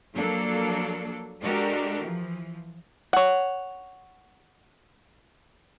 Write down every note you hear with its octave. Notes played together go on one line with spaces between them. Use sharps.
F3 F#3 A#3 D4 A4
G#3 D4 F#4 G4 A4 A#4
E3 F3
C#5 F#5